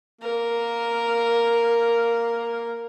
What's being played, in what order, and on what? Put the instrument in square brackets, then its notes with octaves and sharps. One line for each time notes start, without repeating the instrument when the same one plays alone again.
[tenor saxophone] A#3 [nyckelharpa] A#4